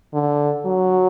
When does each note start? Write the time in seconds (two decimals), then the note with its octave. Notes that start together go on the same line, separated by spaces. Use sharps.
0.14 D3
0.66 F#3